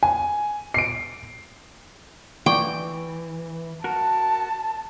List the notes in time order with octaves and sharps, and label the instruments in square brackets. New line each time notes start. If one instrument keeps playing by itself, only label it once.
[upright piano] G#5
C7 D7
[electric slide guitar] E3 [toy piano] D5 C#6 D6 [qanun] G5
[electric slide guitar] F#4 A#4 [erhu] A5